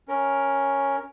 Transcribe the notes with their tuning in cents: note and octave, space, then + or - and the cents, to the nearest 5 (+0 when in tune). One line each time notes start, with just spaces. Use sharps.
C#4 +0 A#4 +0